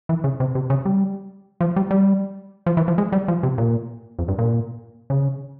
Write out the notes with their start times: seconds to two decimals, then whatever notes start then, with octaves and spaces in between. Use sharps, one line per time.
0.09 E3
0.24 C#3
0.40 C3
0.55 C3
0.70 C#3
0.86 G3
1.61 F3
1.76 G3
1.91 G3
2.66 F3
2.77 E3
2.88 F3
2.98 G#3
3.12 G3
3.28 F3
3.43 C3
3.58 A#2
4.19 F2
4.28 G2
4.39 A#2
5.10 C#3